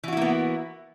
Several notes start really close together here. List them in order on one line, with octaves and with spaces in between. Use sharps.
E3 F#4 E4 A#3 B3